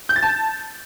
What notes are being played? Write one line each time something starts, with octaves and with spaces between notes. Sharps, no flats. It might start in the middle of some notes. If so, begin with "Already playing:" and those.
G6
A6
A5